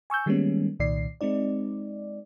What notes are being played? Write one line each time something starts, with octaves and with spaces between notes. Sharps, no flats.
G#5 C#6 E6 G6
D#3 G3 G#3 A#3 B3 C#4
C2 A#2 D#3 D5 C7
G#3 C4 D#4 D5